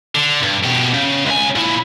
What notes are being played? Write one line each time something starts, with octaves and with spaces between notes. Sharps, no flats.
D3
G2
B2 G4
C#3
C#2 G#5
A#2 E4